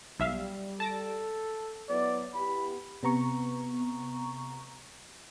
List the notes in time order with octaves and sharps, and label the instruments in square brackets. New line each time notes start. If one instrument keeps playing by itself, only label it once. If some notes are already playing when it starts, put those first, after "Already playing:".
[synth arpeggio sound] B1 E5 F5 [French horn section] G3
[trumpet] A4 [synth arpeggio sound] A5 A#6 D7
[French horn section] F#3 B3 E4 [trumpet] D5
[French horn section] B3 E4 G4 [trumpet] B5
[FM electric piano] C3 B3 A#5 C#6